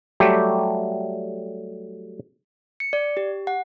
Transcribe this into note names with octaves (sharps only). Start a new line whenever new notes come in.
F#3 G3 A3 G4
C#7
D5
G4
F#5